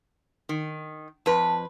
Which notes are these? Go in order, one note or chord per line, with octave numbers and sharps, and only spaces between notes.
D#3
F2 B4 A5